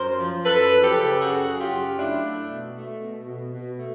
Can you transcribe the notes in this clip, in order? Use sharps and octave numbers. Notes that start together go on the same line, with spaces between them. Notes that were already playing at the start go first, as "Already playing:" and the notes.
Already playing: F#2 A#4 C5
F3
F#2 A4 B4
F3
G4 A4
C#3
F#2 F#4 G#4
C#3
F4 G4
F#2
A3 D4 E4
A3
B2
A3
B2
B2
B2
A3